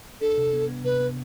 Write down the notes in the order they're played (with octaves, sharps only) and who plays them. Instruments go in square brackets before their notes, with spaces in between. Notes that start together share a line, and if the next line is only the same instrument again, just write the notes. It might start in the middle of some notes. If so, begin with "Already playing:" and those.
[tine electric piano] D4 [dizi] A4
[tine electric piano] C3
B3
B3
[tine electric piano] C3 [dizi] B4
[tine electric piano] B3